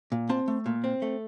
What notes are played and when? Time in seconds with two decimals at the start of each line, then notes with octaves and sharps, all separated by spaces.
0.12 A#2
0.29 C4 A5
0.48 A3
0.66 A#2
0.84 C4
1.02 A3